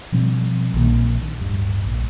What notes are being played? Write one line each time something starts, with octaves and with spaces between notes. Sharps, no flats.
B2 F3 G3 C4
A#1 D#3 G3 A#3
D1 G2
A#1